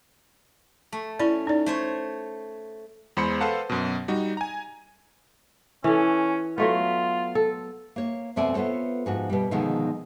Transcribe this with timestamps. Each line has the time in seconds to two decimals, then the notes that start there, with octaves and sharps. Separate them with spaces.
0.93 A3
1.19 C#4 E4 D5
1.47 D#4 D5
1.66 A3 C5 C#5
3.17 E2 G#3 C5 B5 C#7
3.41 A4 B4 C5 F5 F#5 A5
3.70 F#2 B2
4.08 G3 D#4 F#4
4.37 G#5 A#5
5.84 E3 C#4 A4
6.58 F#3 A3 B3 F4
7.35 A4
7.96 A#3 C#5
8.36 F2 B2 A3 C4 D5 G#5
8.54 B3 F4 A4 C5 C#5
9.06 G#2 F3 F#4
9.29 B2 G3
9.51 B2 D3 D#3 F3 G#3 D#4